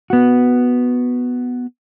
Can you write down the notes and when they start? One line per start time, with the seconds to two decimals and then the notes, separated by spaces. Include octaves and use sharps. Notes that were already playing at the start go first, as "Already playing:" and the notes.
0.10 B3 F#4